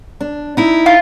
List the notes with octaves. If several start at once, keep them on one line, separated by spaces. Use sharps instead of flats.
D4
D#4 E4
F4